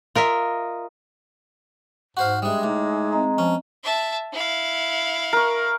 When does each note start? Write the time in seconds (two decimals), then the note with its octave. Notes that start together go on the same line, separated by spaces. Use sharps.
0.15 F4 A#4 D#5 E5
2.17 G#2 F#4 C5 F5
2.42 G3 G#3 D4 E5 D#6
2.63 A2 D#4 D6
3.13 C4 D#5 A#5
3.38 F3 C#4
3.84 E5 A5
4.33 E4 F5
5.33 A#4 C#6